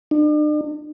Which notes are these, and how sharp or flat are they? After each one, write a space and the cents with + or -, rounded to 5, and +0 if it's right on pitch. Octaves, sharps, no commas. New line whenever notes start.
D4 +45